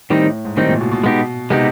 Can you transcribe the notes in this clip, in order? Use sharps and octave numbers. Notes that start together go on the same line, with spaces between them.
A2 D#3 G3 C4 D#4
A2
G#2
A2 D#3 G3 C4 D#4
A#2
B2
B2
G#3 B3 D#4 G4
C3 G#3 B3 D#4 G4